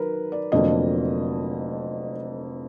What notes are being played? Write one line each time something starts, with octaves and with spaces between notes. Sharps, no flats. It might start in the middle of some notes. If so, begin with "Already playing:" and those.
Already playing: D#3 F#3 A#4 B4
D5
F1 F2 D3 F#3 A#3 D#5